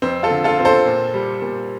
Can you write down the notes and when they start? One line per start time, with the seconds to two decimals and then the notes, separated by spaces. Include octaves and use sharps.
0.02 F2 C4
0.23 F4 A4
0.31 D3
0.44 F4 A4
0.59 C4
0.65 A4 C5
0.86 A#2
1.14 G3
1.42 A#2